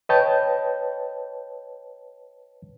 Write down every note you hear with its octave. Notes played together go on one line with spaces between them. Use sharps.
B4 C#5 D#5 G5 A5 G6